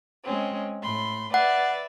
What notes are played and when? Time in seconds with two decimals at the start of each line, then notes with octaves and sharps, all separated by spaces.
0.23 G#3 C4 C#4
0.82 A2 B5 C6
1.34 B4 D5 E5 F#5